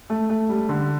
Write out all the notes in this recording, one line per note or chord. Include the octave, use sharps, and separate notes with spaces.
A3
A3
G3
D3